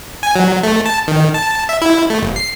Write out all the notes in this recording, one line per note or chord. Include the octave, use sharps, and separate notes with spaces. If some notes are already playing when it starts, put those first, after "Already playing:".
G#5
F#3
A3
A5
D#3
A5
E5
E4
A3
G1
C7